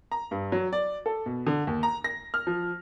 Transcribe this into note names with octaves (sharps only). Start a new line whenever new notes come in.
A#5
G2
F#3
D5
A4
B2
D3
D#2
A#5
A#6
F6
F3